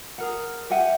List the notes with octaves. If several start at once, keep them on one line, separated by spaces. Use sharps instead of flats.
G#4 A#4 F#5
G4 E5 F#5 G#5